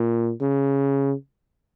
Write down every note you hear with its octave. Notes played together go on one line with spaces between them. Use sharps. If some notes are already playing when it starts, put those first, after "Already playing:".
Already playing: A#2
C#3